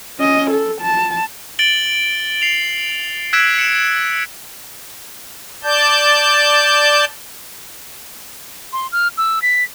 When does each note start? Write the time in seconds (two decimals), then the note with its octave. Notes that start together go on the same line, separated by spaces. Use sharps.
0.19 C#4 D#5
0.51 A4
0.81 A5
1.59 A6 D7 F#7 G7
2.42 C7 F7
3.33 E6 F#6 G#6 B6 D7 E7
3.58 C#7 E7
5.63 D5 A5 G6
8.73 C6
8.92 F6
9.18 E6
9.42 B6